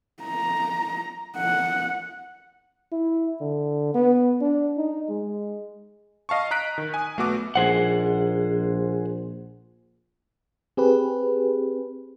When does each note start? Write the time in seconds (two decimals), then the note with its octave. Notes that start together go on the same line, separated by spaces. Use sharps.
0.23 A#5
1.37 F#5
2.92 E4
3.41 D3
3.94 B3
4.41 D4
4.77 D#4
5.09 G#3
6.29 D#5 F5 A5 C#6
6.51 D#5 A#5 F#6 B6 D7
6.78 D#3
6.94 G#5 D#6
7.17 B1 A3 B3 F#4 A4 D6
7.55 A#1 G#4 C5 F#5
10.77 C4 G4 G#4 B4